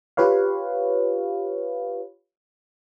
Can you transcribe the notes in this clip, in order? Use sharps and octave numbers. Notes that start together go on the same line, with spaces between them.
F4 G4 B4 C#5 F5